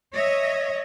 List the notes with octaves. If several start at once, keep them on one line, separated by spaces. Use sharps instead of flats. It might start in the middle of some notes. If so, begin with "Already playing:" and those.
C#5 D#5 E5